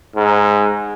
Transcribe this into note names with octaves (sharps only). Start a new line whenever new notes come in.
G#2